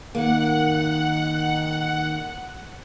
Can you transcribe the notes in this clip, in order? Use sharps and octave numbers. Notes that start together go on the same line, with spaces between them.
D#3 A#3 F#5